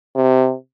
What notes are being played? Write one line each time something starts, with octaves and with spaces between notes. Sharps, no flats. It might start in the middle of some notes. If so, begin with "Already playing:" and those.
C3